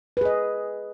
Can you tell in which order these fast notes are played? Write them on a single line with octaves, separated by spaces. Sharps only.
B4 G#4 D#5